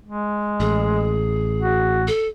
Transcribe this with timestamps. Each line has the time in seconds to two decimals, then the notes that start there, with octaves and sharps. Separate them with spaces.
0.05 G#3
0.60 A1 G#4
1.61 F#4
2.07 A4